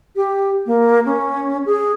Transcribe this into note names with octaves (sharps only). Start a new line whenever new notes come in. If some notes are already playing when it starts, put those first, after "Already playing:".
G4
A#3
C#4
G#4